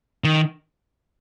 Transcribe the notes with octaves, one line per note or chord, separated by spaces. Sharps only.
D#3